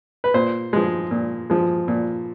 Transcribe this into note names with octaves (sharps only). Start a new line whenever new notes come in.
B4
A#2 C5
F3 G#3
A#2
F3 G#3
A#2